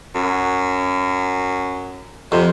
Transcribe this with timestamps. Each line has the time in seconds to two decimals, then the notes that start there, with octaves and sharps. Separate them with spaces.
0.15 F#2
2.32 F2 C3